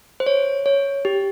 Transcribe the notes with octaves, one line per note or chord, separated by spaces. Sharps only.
C5
C#5
C#5
G4